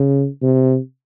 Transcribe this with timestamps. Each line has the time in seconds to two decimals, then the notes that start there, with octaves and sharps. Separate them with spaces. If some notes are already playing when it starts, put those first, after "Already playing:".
Already playing: C#3
0.42 C3